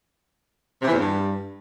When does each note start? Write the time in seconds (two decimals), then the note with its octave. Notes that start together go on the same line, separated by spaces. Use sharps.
0.82 C3
0.87 E3
0.93 E2
0.98 G2